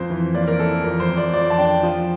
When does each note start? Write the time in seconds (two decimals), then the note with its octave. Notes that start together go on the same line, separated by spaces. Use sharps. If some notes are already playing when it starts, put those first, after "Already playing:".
Already playing: F2 C5
0.10 E3
0.34 A#3 D5
0.47 A#4
0.59 E3 A4
0.84 F2 A#4
1.00 C5
1.09 F2
1.17 D5
1.33 F2 D5
1.50 A5
1.58 D4 G5
1.83 F3